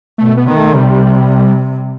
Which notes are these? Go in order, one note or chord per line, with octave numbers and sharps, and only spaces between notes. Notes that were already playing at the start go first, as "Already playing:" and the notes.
B2 A3
B3
D#3 B3
A3
C3 G3